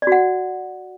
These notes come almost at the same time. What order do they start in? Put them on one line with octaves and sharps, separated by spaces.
D5 F#4 F#5